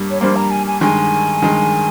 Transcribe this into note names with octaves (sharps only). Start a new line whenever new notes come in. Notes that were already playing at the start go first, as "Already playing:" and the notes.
Already playing: G2 G3 A#3
C#5
G2 G3 A#3 C5
A#5
G#5
G#5
G2 D#3 G#3 G#5
G2 D#3 G#3